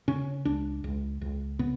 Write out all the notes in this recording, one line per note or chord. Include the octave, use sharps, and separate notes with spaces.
C#3 C#4
C#2 D4
C#2
C#2
C#3 B3